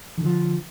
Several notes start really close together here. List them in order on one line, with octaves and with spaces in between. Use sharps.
D#3 D3 F3